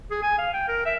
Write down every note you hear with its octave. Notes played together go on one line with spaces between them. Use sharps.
G#4
G#5
F5
G5
A#4
E5